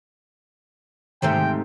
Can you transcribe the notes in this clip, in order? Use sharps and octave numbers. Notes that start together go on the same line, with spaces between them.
G#2 C3 D#3 A3 G5